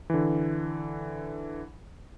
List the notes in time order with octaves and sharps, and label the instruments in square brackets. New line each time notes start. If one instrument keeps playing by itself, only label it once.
[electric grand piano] D3 E3